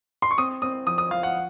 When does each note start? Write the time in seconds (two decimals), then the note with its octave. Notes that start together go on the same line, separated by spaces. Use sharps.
0.22 C6
0.31 C#6
0.38 C4 D#6
0.62 C4 D#6
0.87 F3 D#6
0.98 D#6
1.11 F3 F5
1.23 F#5